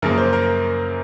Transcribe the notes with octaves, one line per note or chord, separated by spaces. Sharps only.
F#2 C#3 F3 A#3 A#4
C5
A#4